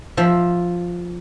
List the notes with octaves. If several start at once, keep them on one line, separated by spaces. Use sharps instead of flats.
F3 E5